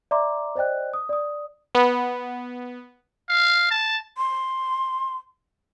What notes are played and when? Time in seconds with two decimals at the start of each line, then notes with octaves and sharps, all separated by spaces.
0.11 D5 E5 A#5 C6 D6
0.55 C5 D5 D#5 G5 F#6
0.94 D#6
1.09 D5 D#6
1.75 B3
3.29 F5
3.71 A5
4.18 C6